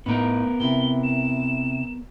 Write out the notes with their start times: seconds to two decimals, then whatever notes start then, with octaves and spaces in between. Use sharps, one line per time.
0.06 A2 B3 D#4 A#4
0.60 C3 E4 G7
1.04 E7